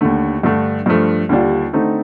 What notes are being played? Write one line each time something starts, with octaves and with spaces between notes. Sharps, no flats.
D#2 D3 A3
G2 D3 A3
G2 F3 A3
D#2 D3 G3 D4 F4
D3 A3 C4 D#4